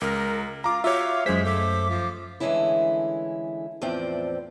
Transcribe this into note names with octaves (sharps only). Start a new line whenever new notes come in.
C#2 A#4
F4 F5 A#5 D6
F4 F#4 C#5 E5 D6
F#2 G#3 G#4 C5 B6
A3 D6
F3
D3 E3 G#3 A3 C#4 E4
E2 A2 F3 C4 D5 G5